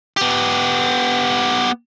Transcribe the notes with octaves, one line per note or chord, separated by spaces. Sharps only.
B3 G4